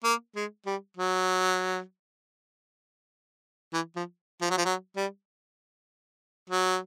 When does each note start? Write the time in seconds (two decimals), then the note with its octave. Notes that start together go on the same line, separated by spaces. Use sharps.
0.04 A#3
0.35 G#3
0.66 G3
0.97 F#3
3.73 E3
3.96 F3
4.42 F3
4.50 F#3
4.58 F3
4.65 F#3
4.96 G3
6.49 F#3